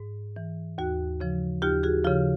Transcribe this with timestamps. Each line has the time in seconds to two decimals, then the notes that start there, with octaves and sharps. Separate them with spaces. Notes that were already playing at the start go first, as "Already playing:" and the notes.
Already playing: G#2
0.36 E3
0.78 D#2 F#4
1.20 C#3 F3
1.62 D#2 F4 G4
1.83 F#4 G#4
2.04 C#3 F3 F4 G4